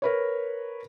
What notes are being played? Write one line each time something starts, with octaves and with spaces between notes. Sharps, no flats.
A#4 B4 C#5